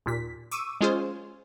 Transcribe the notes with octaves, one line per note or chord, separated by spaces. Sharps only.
D#2 A#2 B6
C#6 D6 E6 D#7
G#3 C#4 F4 G#4 C5